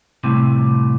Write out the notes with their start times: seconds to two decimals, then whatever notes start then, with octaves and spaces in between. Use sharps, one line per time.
0.24 C2 A2 C3